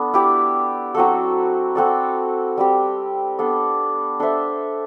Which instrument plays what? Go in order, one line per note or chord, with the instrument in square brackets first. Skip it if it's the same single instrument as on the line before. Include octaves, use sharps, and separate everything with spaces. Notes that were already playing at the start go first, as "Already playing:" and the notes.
Already playing: [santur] B3 D4 A4
E4 G4 D5
F#3 C4 F#4 A4
C4 F#4 A4 D5
G3 C4 G4
B3 D4 A4 D5
D4 A4 C5 E5